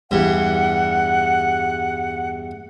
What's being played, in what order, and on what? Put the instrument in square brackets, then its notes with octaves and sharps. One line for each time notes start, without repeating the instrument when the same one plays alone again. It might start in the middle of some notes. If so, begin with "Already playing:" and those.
[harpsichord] E2 G2 [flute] F#5